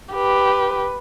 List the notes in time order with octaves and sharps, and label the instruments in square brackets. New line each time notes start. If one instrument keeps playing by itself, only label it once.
[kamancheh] G4 B4